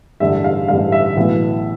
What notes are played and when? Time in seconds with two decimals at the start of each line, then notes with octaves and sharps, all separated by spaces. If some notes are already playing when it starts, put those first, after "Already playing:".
0.20 A1 G2 D3 E5
0.44 F5
0.68 A1 G2 D3 F5
0.92 E5
1.17 B1 A2 E3